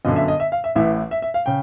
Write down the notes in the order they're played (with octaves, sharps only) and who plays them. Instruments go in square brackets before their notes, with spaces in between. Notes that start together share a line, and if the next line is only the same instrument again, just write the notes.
[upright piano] G1 F#2 D3 D#5
E5
D#5
E5
F5
E5
A1 A2 E3 E5
E5
E5
F5
C#3 G5